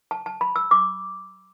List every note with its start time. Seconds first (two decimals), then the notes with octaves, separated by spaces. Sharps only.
0.11 A5
0.26 A5
0.41 B5
0.56 E6
0.71 D6